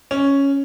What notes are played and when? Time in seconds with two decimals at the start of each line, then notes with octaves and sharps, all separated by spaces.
0.11 C#4